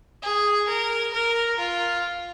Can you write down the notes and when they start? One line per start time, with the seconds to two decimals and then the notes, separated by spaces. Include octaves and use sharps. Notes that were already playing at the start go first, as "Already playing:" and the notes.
0.22 G#4
0.68 A#4
1.13 A#4
1.58 F4